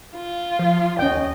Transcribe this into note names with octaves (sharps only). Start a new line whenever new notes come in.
F4
F3
D#2 C#4 D#5 G5